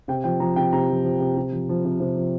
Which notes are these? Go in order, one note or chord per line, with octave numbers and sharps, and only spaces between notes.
C3 G5
F3 G5
F3 A#5
C3 G5
C3 A#5
F3
F3
C3
C3
F3
F3
C3
C3
F3